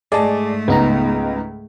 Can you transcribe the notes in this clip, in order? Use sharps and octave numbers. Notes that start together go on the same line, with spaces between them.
G#2 A3 G#4 D5 D#5 A5
C#2 B3 D#4 A#5